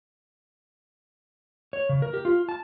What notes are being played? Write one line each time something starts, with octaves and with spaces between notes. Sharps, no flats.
C#5
C#3
A#4
G4
F4
A5